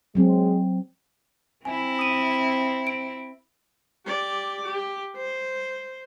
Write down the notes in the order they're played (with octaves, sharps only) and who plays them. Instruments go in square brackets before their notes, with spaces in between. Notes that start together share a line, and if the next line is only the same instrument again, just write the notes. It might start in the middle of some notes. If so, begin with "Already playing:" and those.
[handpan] F#3 C4 [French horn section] G#3
[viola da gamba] C4 E4 [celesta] G#5
[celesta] D#6 D#7
D7
[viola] G4 D5
G4
C5